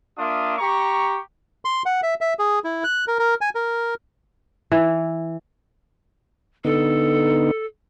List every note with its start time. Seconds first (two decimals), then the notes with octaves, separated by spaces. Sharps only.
0.18 A#3 D4 F4 E5 D#6
0.58 G4 A#5 C#6
1.65 C6
1.86 F#5
2.03 E5
2.21 E5
2.39 G#4
2.64 E4
2.84 F#6
3.08 A#4
3.19 A#4
3.41 G#5
3.55 A#4
4.72 E3
6.65 D3 B3 D#4 A4